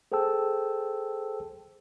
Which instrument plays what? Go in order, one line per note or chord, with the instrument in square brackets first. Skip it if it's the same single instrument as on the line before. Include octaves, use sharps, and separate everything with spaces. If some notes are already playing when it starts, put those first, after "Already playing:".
[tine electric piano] G#4 A4 C5 G5 A5 E6